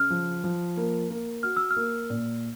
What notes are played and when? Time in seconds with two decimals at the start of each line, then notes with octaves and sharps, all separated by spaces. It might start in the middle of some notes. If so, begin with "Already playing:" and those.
Already playing: C#3 F6
0.10 F3
0.44 F3
0.77 A#3
1.10 A#3
1.43 F#4 F6
1.57 E6
1.71 F6
1.76 A#3
2.10 A#2